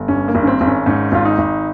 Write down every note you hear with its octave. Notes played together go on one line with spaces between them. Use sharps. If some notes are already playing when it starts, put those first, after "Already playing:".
Already playing: G1
G2 C#4
A#3
G#1
C#4
C4
G#1
C#4
G#2 C#4
G#1 F4
D#4
G#1